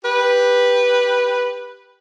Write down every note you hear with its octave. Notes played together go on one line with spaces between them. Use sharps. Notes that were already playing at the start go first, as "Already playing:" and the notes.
G4 B4